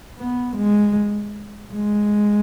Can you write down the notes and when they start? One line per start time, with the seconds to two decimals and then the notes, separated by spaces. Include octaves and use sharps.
0.18 B3
0.57 G#3
1.73 G#3